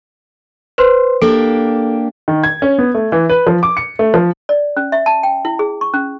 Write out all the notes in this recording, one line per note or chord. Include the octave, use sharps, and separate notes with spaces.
B4 C5 C6
A#3 D4 G4 A4
D#3
G#6
C#4
B3
A3
E3
B4
F3
D6
C#7
A3
F3
D5
C#4
E5
A5
G5
E4
G#4
C#6
C#4